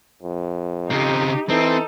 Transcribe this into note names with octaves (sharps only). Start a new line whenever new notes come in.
F2
C#3 C4 D#4 G4
E3 C4 D#4 A4